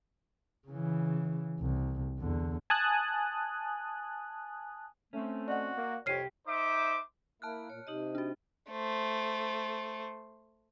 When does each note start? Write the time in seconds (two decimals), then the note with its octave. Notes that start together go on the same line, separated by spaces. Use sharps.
0.68 C#3 E3
1.60 C2
2.20 E2 D3
2.70 G#5 A5 D#6 F#6
5.13 A3 C4 C#4
5.48 F#4 D5 D#5 F#5
5.77 A#3
6.06 C2 F2 G4 C#5 F6 C7 D#7
6.47 D#4 C5 E5 D6
7.42 A#3 E4 A5 F6 F#6
7.70 A#2 C#5
7.87 C3 D#4 G4 D#5
8.15 D4 F#4
8.71 A3 C5